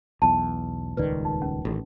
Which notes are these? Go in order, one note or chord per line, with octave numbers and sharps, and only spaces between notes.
B1 E2 A5
D#1 C#2 D#3 B4 D5
D#4
C#4
A1 D#3